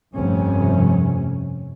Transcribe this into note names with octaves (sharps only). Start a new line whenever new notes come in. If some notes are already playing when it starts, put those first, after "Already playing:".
F1 G2 C3 C#4